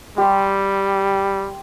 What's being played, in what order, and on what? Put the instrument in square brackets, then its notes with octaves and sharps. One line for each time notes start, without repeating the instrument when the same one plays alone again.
[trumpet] G3 [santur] G4 C6